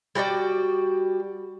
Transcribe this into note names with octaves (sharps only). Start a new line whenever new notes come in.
G3 F#4 D5 G5